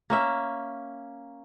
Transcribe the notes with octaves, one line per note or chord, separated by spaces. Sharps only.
A#3 C#4 E5